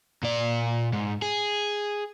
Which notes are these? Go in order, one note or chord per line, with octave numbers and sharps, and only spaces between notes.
A#2 D5
G#2
G#4